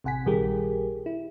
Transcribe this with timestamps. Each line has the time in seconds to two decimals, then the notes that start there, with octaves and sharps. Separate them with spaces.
0.04 A1 C3 F#5 G#5 B6
0.26 A#1 D#3 G3 G4 G#4 A#4
1.06 E4